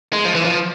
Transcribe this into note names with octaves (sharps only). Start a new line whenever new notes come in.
G#3
F3
E3
F3